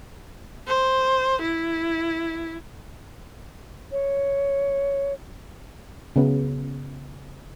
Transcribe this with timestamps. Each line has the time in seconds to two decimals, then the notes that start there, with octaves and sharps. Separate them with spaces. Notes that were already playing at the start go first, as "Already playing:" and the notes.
0.67 C5
1.42 E4
3.92 C#5
6.16 C#3 B3